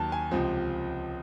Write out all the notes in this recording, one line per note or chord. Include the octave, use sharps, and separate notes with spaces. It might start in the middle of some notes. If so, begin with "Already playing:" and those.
Already playing: D#2 D#3 F#3 A5
G#5
C#2 C3 F3